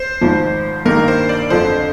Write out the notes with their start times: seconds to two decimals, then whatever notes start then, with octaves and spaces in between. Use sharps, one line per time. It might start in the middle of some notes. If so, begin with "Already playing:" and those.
Already playing: C5
0.21 G#1 G#2 F3
0.85 G2 D#3 A#3 A#4
1.08 C5
1.29 D5
1.50 F2 D3 F3 C5